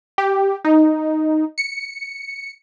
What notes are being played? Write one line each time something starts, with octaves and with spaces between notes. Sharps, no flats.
G4
D#4
C#7